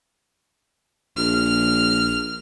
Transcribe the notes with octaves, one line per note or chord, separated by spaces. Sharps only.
A#1 F6